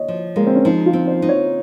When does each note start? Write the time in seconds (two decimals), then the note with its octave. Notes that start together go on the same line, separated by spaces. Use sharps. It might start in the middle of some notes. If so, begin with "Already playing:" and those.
Already playing: C#5 D#5
0.08 F3
0.36 G#3 A#3
0.46 C4
0.55 C#4
0.65 F3 D#4
0.86 F4
0.93 C4
1.08 C5
1.22 D#4
1.29 C#5